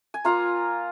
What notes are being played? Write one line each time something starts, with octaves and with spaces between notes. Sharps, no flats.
G#5
A#3 F4 F5 A#5